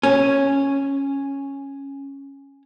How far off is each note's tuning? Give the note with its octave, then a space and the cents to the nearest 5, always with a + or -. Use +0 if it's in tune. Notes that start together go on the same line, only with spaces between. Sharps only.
C#4 -5